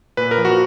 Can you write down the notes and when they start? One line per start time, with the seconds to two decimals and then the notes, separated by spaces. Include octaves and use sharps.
0.17 A#2 B4
0.31 A#4
0.38 F3
0.45 F#4